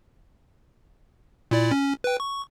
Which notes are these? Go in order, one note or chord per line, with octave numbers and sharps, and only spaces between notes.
A#2 E4 D5
C#4
B4 G5
C#6